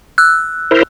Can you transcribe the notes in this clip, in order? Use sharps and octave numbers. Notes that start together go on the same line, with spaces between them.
E6 F#6
E4 A#4 C5